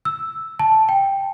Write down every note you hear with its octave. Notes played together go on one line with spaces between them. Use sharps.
E6
A5
G5